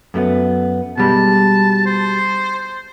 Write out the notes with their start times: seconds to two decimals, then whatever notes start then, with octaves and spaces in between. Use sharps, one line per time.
0.14 F#2 A3 B3
0.98 B2 G3 G#3 A5
1.86 C5